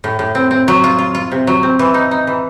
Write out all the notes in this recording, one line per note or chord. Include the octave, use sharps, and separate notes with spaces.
A2
A2
C4
C4
F#3
F4
F4
F4
C3
F#3
C4
E3
D#4
D#4
E3